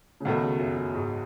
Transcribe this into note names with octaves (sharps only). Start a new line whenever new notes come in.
C#3
C#2 B2 D#3 A3
C#3
F#2
F#2
G#2